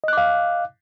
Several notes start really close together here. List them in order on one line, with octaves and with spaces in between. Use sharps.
D#5 F#6 D6 F5